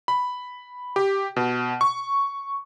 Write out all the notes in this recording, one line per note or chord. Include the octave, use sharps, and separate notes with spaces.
B5
G4
B2
C#6